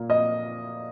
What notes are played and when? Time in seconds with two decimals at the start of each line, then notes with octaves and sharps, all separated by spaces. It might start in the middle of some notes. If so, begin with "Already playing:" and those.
Already playing: A#2 A#3
0.10 D#5